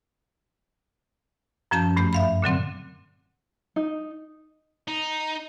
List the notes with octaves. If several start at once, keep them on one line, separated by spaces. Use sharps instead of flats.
F#2 F3 C#4 A5 G6
G2 A3 B5 G6
E5 F5 B5
A#2 D3 F#3 C4
D#4
D#4